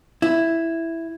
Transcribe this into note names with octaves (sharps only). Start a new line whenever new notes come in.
E4